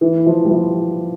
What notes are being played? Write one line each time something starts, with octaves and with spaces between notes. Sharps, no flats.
E3
F3
G3
F3